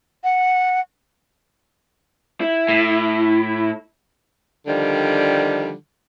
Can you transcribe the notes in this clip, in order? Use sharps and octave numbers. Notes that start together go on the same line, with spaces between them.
F#5
E4
A2
D3 D#3 F3 G3